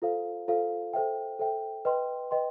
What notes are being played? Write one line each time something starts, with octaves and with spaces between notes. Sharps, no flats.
F4 A4 C5 F5
F4 A4 C5 F5
A4 C5 E5 G5
A4 C5 E5 G5
B4 D#5 G5 C6
B4 D#5 G5 C6